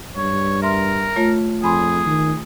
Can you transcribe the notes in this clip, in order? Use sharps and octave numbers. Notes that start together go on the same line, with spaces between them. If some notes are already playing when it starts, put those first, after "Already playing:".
G2 C#5
A#4 E5 C6 F6
A3 F4 C#5
F2 G#4 G#5 B5 C6
D#3